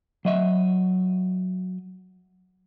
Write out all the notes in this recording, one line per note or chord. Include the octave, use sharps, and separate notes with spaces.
F#3 D#5 E5